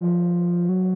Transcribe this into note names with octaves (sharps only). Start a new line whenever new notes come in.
F3
F#3